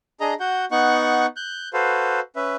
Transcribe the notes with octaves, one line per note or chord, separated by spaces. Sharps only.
D4 G#4 D#5 A#5
F#4 F#5 G6
B3 D#4 F#5 C#6 F#6
F#6 G6
F#4 A4 B4 C5 F5
C#4 B4 E5